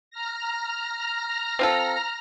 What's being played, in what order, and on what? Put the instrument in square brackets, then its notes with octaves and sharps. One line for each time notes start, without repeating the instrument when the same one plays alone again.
[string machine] A#5 F6 A#6
[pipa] C4 F4 A4